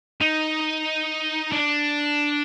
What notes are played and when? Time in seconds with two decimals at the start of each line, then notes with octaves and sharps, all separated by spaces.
0.21 D#4
1.52 D4